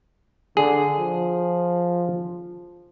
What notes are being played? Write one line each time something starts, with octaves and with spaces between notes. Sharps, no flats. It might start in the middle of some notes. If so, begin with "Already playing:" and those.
D3 G#4
F3